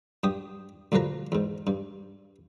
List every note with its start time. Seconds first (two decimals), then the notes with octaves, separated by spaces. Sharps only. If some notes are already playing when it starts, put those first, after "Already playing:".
0.24 G2 G4 D#6
0.92 D2 G2 F3 A#4 B4 A#5
1.32 E2 G#2
1.67 G2